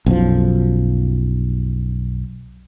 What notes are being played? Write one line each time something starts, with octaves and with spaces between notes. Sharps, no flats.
B1 F#2 F3